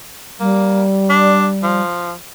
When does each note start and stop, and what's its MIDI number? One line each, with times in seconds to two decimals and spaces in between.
0.40 1.82 55
0.40 0.84 58
1.10 1.48 62
1.63 2.13 53